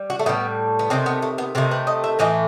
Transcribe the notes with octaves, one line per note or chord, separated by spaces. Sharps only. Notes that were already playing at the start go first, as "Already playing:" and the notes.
Already playing: G3
F#4
A3
A2 E3 G3 B3
B3
C3 D#3 A3 C4
B3
A3
B3
C3 D#3 A3 C4
B4
D#5
E5
A2 E3 A3 D#5